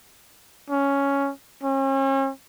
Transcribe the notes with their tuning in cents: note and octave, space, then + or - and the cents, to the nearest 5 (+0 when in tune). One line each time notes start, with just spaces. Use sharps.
C#4 +5
C#4 -40